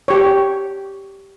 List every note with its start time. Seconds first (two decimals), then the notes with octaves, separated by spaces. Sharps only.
0.08 G4 C#5